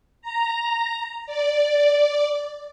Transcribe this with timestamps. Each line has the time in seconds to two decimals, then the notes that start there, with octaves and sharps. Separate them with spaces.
0.22 A#5
1.26 D5